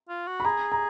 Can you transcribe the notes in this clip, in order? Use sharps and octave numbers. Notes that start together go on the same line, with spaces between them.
F4
F#4
B5
G#4 A#5
A#5